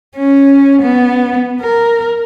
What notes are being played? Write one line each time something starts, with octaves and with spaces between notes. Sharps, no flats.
C#4
B3
A#4